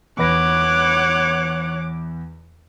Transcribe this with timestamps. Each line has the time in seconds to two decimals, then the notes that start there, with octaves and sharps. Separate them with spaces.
0.18 E2 B4 C#5 F#5 D6 A#6